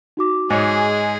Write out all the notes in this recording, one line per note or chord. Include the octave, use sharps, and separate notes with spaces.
D#4 F#4 D6
G#2 G#3 G#4 C#5